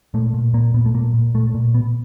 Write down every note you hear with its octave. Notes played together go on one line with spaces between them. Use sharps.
A#2 A3
A#2
A#2 A#3
A#2 B3
A3
A#2 A#3
A#2
A#2 A3
A#2
B2 B3